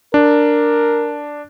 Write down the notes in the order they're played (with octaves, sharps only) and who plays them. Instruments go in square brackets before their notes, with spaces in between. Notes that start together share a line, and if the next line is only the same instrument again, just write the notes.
[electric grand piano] D4 [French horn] A#4